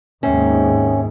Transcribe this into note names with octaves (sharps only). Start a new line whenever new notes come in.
D#2 G#2 C3 C#4